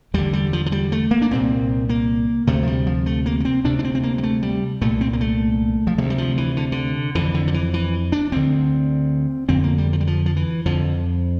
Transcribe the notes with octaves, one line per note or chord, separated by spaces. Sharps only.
E2 D3 G3
G3
F3
F3
G3
A3
A#3
D4
C2 A#2 C4
A#3
D2 C3 A3
F3
G3
F3
A3
A#3
A#3
C4
D2 C3 D4
D4
C4
C4
A#3
G3
A3
G3
C2 A#2 A3
C4
A#3
A3
F3
D2 C3 G3
G3
F3
E3
D3
D3
F2 D3 E3
D3
F3
E3
E3
D4
D2 D3 C4
F2 D3 C4
A#3
G3
F3
G3
F3
F3
E3
F2 D3 F3